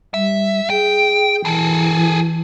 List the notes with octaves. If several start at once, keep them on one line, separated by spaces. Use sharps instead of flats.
G3 E5
G#4 G5
E3 G#4 A4